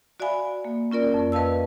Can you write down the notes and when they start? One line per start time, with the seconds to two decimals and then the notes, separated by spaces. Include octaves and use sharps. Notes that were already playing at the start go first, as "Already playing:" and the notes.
0.20 F#4 D5 E5 F5 G#5 B5
0.65 A#3
0.91 C#4 F4 A#4 D5
1.14 F2
1.32 B4 D#5 F5 A5 E6